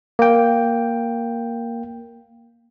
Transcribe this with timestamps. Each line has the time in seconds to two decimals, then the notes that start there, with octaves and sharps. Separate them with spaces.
0.19 A#3 G5